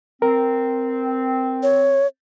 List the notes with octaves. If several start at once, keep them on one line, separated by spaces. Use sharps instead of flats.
C4 A#4
C#5